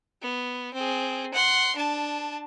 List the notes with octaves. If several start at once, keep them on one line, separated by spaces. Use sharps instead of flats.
B3
C4 G#4
F#5 C6
D4 A5